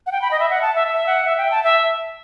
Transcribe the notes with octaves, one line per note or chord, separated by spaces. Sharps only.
F#5
G5
B5
D#5
E5
F#5
A5
E5
E5
F#5
E5
G5
A5
E5